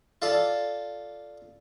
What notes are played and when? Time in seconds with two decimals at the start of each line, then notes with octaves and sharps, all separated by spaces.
0.22 F4 A4 D5